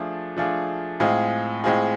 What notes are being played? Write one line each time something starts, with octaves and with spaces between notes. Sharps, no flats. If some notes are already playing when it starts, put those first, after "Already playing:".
Already playing: F3 A3 D4 F4 G#4
F3 A3 D4 F4 G#4
A2 G#3 C4 F4 G#4
A2 G#3 C4 F4 G#4